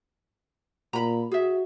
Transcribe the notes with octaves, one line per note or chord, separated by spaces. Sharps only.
A#2 A#5 B5
F#4 G#4 E5